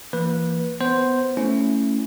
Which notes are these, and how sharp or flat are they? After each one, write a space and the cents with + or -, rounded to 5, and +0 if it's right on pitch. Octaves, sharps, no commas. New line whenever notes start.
E3 +35 A#3 +0 B4 -15
B3 +20 C5 +0
A3 +15 C#4 +0 E4 +0